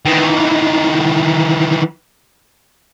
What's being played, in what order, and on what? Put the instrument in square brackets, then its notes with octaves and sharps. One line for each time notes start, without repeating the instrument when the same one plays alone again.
[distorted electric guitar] D#3 E3